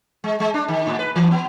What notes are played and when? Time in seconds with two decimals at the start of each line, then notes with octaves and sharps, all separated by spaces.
0.24 G#3
0.40 G#3
0.54 D4
0.68 D#3
0.87 A2
0.99 B4
1.16 E3
1.31 B3